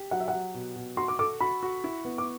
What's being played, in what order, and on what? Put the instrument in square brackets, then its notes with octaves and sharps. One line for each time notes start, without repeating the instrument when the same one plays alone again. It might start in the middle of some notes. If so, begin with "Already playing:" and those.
Already playing: [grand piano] G4
[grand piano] F#3 [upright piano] F#5
[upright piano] E5
F#5
[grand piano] F#3
B2
B2
[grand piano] F#4 [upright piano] C6
[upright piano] D6
[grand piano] A4 [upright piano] D6
[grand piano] F#4 [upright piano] B5
[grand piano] F#4
E4
B3
[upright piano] D6